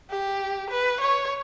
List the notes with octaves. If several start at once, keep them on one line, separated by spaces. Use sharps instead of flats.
G4
B4
C#5